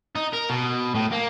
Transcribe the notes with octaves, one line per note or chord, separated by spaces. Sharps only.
D#4
A#4
B2
A2
A#3